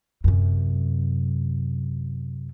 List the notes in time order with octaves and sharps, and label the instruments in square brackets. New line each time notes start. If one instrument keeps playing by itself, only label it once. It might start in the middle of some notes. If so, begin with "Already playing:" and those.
[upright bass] F#2 C3